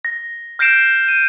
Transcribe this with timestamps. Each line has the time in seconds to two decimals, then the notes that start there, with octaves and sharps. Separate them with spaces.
0.05 A#6
0.59 F6 G6 A#6 C7 D7 E7
1.08 D#7